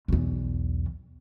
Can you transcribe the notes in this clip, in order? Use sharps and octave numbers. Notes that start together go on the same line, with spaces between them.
B1 E2